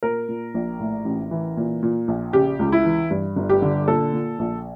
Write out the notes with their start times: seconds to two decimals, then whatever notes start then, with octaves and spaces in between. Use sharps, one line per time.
0.03 A#2 A#4
0.29 A#2
0.54 A#1
0.79 A2
1.05 A1
1.31 E3
1.57 A#2
1.83 A#2
2.08 A#1
2.33 C#3 G4
2.59 C#2
2.72 E4
2.85 E3
3.10 G2
3.36 G1
3.50 G4
3.62 D3
3.88 A#2 A4
4.13 A#2
4.39 A#1